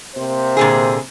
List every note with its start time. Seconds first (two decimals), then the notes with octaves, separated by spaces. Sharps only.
0.16 C3 A#3 C5
0.57 A#2 D3 G#4